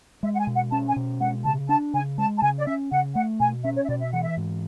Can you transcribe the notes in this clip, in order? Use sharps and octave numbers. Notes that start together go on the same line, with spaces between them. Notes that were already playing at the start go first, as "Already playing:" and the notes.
G#3 E5
F#5
G#5
B2
F#5
C#4 A5
G#5
B2
G#3 F#5
C#3 A5
D4 A5
C#3 G#5
G#3 A5
A5
C#3 G#5
D5
C#4 E5
C#3 F#5
A3 F#5
B2 G#5
C#4 E5
C#5
E5
B2 D5
E5
E3 F#5
E5
G#2